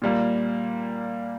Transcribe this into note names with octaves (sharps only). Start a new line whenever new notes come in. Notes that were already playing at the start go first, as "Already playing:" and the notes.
A#2 G3 A#3